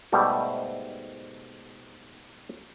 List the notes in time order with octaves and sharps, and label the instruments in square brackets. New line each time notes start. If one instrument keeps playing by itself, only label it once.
[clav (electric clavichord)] G#2 B2 G3 A3